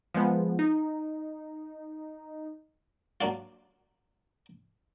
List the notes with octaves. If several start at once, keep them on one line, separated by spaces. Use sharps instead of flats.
F3 G#3 B3
D#4
F#3 A#3 D4 F4